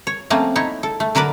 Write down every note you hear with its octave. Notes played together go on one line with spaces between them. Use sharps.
C#5
F3 A3 A#3 C4 C#4
D#4 E4 C#5
A4
A3
D3 F#3 A#4 B4 D5